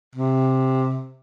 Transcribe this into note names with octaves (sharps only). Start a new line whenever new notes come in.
C3